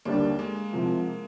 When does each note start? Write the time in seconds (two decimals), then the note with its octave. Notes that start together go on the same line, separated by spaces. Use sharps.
0.05 D#2 D3 G3 A#3 D4
0.39 G#3
0.73 C2 C3 F3